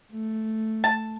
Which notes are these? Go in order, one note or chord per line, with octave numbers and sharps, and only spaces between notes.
A3
A5